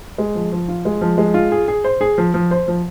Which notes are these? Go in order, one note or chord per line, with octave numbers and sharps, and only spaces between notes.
G#3
F3
F3
F4
G#3
F3
G#3
F4
G#4
G#4
C5
G#4
F3
F3
C5
F3